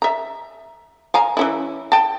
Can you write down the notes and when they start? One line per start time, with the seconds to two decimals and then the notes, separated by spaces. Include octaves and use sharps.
0.02 E5 A#5
1.14 F5 G#5 A#5
1.37 E3 C#4 E4
1.92 G5 A5